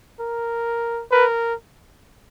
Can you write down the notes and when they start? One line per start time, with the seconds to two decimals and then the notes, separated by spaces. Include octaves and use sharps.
0.20 A#4
1.11 A#4 B4